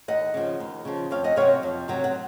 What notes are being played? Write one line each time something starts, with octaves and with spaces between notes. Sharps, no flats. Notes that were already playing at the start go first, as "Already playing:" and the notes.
D#2 D#5 F#5
C#3 F3
D#2
C#3 F3
F2 C#5 F5
D#5 F#5
C3 F#3 C#5 F5
F2
C3 F#3
F#5